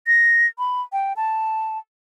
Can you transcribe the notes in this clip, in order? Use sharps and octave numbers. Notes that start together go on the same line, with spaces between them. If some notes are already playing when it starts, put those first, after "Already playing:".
A#6
B5
G5
A5